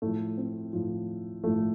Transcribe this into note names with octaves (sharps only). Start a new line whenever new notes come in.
A2 F3 A3
C4
A2 F3
A2 F3 A3